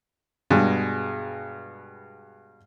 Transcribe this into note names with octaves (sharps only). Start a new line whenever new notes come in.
G2 B2 G#3